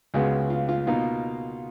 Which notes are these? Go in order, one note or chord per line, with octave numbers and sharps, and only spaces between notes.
C#2 C#3 G#3 B3 F#4
F4
F4
B2 A#3 D#4 F4